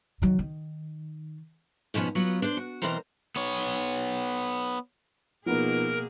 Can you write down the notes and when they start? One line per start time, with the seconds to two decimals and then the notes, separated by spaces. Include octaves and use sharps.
0.22 D#3 F#3
0.39 D#3
1.94 G#2 B2 F3 B3 C#4
2.15 F#3 B3 F4
2.42 D4 C5
2.57 F#4
2.82 B2 E3 C4 A#4 C5 A#5
3.36 B3 C#5
5.46 B2 F3 A#3 B3 D#4 G#4 A#4